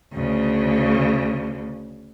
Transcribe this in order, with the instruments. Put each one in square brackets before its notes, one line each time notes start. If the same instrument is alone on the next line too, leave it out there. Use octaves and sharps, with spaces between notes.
[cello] D2 C#3